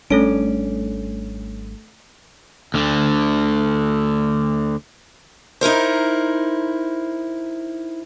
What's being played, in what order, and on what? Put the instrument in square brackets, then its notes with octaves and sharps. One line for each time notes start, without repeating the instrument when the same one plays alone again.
[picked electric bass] G#1 G3 D4 [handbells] A3 A4 D7 [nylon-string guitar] C#4
[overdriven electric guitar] D2 D3
[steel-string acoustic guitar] D#4 E4 A#4 C5